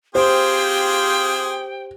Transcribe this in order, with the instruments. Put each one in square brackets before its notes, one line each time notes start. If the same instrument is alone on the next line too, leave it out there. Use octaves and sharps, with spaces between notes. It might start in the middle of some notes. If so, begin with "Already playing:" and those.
[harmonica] C4 F4 G#4 [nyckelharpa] G4 [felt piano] C5 [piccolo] G5